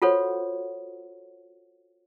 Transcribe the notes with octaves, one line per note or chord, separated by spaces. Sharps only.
F4 F#4 A4 C5 C#5 F#5